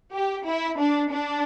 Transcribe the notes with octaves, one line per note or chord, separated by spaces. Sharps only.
G4
E4
D4
D4